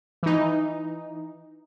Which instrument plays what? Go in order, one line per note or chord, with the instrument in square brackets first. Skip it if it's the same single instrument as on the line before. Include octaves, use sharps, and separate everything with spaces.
[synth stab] E3 D#4